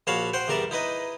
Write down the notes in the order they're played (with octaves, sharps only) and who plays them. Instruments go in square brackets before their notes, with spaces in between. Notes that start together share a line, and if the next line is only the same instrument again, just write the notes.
[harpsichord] A#1 F#4 C#5 F5 A5 B5
C5 F#5 G5
E2 G3 A#4 D5 E5
D#4 E4 B4 D#5